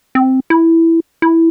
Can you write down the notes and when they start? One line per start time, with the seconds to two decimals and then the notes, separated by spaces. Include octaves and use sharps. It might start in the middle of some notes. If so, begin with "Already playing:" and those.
0.15 C4
0.50 E4
1.22 E4